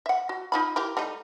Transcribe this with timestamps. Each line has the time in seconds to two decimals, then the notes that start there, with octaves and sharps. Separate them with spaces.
0.06 E5 F#5
0.29 F#4
0.52 D#4 F4 B5
0.76 E4 G4 A#4
0.97 G3 A3 D#4